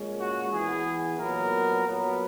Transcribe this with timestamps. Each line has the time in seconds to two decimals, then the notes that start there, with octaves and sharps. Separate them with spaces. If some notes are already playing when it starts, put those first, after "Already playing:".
Already playing: A#2 G#3 C#4
0.19 F#4
0.52 E3 B3 G#4
1.18 A#2 F#3 B3 A#4
1.85 A#2 F#3 B3